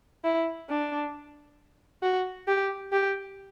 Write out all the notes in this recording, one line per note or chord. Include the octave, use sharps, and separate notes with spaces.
E4
D4
F#4
G4
G4